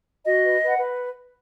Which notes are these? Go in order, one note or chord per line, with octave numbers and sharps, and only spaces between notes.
F#4 D#5
B4
B4
F#5
B4